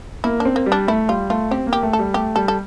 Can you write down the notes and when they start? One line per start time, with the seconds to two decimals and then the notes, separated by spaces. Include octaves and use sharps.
0.24 A#3 E4
0.40 D4
0.45 C4
0.56 A#3
0.66 G3
0.72 D4
0.88 A3 E4
1.09 G3 F4
1.30 A3 F4
1.51 C4 G4
1.67 A#3
1.73 G4
1.83 A3
1.93 A4
1.99 G3
2.14 A3 G4
2.36 G3 A4
2.48 A4